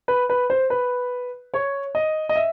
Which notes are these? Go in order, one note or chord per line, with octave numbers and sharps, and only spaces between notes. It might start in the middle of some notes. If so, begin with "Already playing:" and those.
B4
B4
C5
B4
C#5
D#5
D#5
E5